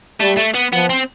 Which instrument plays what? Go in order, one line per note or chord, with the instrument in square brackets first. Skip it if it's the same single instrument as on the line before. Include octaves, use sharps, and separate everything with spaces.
[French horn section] G3 [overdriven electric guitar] A3
[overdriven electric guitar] A3
B3
[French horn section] F3 [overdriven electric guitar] B3
[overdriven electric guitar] C4